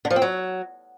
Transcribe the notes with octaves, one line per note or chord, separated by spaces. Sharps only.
D3
F3
C4
F#3